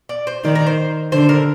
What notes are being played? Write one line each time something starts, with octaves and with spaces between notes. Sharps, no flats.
D5
C5
D#3 D5
A#4
C5
D3 C5
A#4